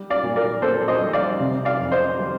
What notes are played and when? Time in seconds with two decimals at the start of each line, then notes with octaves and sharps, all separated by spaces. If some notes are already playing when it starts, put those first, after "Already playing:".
Already playing: G3
0.10 D5 F5
0.23 A#2
0.36 A#4 D5
0.62 A#2 A4 C5
0.88 C5 D#5
1.01 G3
1.13 D5 F5
1.40 C3
1.65 D5 F5
1.79 F2
1.92 C5 D#5
2.18 G3